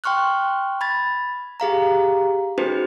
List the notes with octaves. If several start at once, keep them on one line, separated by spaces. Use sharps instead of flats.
G5 C6 C#6 F6 F#6
B5 G#6 A6
G4 G#4 F5 A#5
C#4 D#4 F#4 G#4 B4 C5